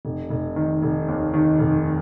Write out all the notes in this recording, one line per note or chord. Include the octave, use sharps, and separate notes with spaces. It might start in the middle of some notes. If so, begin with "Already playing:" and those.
F1
F1
D#3
F1
D#2
D#3
F1